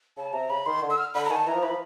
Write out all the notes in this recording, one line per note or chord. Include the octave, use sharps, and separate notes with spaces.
C#3 A5
C3 A#5
C#3 B5
D#3 C6
D3
E6
F6
D3 B5
A#5
D#3 G#5
A5
E3 A#5
F3
E3 B5
F3